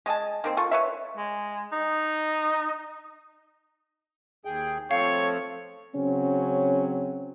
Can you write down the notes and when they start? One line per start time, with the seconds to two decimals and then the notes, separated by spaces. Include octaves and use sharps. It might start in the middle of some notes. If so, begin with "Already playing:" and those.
0.06 G#3 D#5 G#5 A5
0.44 D#3 A#3 C4
0.57 F4 A4 C#6
0.71 B4 C#5 E5
1.17 G#3
1.72 D#4
4.45 D#2 G#4 G5
4.91 F3 A3 C4 C#5 F5
5.95 C#3 F#3 C4 C#4